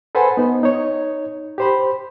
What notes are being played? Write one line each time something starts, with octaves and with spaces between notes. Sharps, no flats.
A4 B4 C5 F#5 G#5 B5
B3 D#4
D#4 C#5
G4 C5 B5